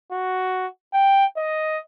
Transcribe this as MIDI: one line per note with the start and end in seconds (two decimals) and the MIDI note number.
0.12 0.67 66
0.94 1.25 79
1.37 1.80 75